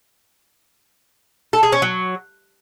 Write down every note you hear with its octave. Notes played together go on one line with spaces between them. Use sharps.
A4
G#4
C#4
F#3